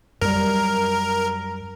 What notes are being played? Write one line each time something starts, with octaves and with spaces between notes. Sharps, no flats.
F#2 G3 A#4